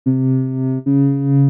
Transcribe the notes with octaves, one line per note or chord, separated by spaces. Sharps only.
C3
C#3